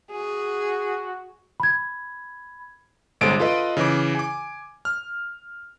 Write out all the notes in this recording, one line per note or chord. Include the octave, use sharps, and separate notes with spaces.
F#4 G#4
B5 G#6
G1 C3 G#3 A4 C5 D7
F4 A4 B4 D#5
C#3 E3 D6
G#5 D6
F6